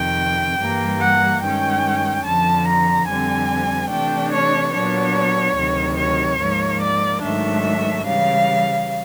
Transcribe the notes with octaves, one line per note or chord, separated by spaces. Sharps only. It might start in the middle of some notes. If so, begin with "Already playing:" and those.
Already playing: F2 C3 D#3 G5
G2 E3 G3 A#3
F#5
G2 D#3 G#3 C#4 G5
F2 D3 F3 A5
A#5
F2 D3 G3 C4 G#5
C3 E3 A3 D4 G5
C#5
A#2 F#3 B3 D4 C#5
D2 C3 D#3 F#3
C#5
G#2 F3 A#3
D5
G#2 D#3 F#3 A3 D4 E5
C#3 E3 G3 F5